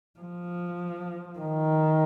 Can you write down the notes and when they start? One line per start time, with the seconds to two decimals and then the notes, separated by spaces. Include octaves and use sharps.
0.20 F3
1.39 D#3